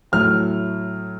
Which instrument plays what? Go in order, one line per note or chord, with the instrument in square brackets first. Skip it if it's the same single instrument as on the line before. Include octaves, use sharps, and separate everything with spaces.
[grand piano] A2 F#3 A3 F6